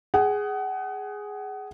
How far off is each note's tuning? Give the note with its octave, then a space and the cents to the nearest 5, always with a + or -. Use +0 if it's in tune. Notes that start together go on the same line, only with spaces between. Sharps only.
G#4 +0 F#5 +30